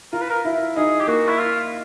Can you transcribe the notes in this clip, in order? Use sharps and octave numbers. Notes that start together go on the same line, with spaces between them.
F4 A#4
B4
A#4
E4
D#4 G#4
G4
A#3 F#4
E4
F4